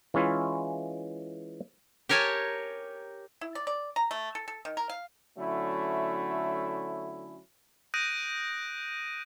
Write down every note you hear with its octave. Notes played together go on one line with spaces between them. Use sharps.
E3 G#3 C#4 E4 F4
G4 A#4 C#5 G#5 A5
E4
D5
D5
A#5
A3
A4
A4
D#3
A#4
F5
D3 F#3 A3 C#4 E4
D#6 F#6 G6 A#6 D7 D#7